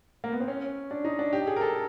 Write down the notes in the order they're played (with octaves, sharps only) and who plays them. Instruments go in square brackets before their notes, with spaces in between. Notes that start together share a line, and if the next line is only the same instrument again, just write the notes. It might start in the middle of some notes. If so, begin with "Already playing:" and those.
[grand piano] A#3
B3
C4
C#4
D4
D#4
D4
G4
G#4
A#4
A4